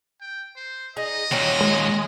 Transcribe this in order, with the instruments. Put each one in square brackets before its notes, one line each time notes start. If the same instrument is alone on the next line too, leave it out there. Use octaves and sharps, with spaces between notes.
[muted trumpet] G5
C5
[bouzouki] D#4 G#4 [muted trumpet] D#5
[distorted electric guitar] D#2 A#2 [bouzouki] D#3 F#3 C#4
[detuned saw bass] G#3